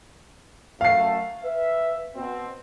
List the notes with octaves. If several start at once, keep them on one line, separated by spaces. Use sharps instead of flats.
F#2 A3 F5 C7
B4 E5
B2 C4